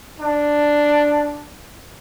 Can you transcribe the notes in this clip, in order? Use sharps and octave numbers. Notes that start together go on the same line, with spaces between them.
D4